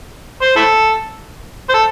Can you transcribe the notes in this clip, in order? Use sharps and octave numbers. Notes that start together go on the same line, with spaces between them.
C5
E4 A4
C5
A4